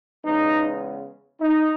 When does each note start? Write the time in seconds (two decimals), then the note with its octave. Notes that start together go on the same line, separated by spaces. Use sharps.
0.24 E2 C#3 G#3 B3 D#4
1.40 D#4